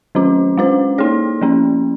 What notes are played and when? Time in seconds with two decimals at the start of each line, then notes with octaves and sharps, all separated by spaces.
0.15 D#3 F#3 C#4 F4
0.58 G#3 C#4 F4 C5
0.98 A#3 D#4 G#4 C#5
1.41 F3 A#3 C#4